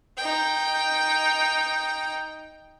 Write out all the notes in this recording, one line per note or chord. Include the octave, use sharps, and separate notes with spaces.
D#4 G5